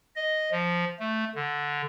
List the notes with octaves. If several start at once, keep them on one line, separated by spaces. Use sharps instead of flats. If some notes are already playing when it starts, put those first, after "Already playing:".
D#5
F3
A3
D3